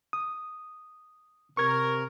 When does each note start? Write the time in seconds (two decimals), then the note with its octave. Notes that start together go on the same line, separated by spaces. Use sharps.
0.13 D#6
1.57 C3 A#4 C#6 G#6